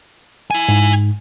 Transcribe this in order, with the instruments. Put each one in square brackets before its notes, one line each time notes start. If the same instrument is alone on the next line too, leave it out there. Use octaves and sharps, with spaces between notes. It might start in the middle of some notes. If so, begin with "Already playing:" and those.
[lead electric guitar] E4 G#5
[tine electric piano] G#2